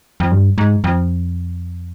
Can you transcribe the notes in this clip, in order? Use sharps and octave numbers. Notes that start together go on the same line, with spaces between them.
F2
G2
G#2
F2